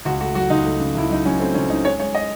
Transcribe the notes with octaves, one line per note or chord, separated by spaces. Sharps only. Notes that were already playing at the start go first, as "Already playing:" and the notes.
C#2 F#4
A3 F#4
F#3 F#4
C#2 D#4
A3
C#3
C#2 E4
F#3 D#4
F#3 C#4
A3 C4
C#2 C#4
C#3 D#4
G#3 C#5
G#3 C#5
D#5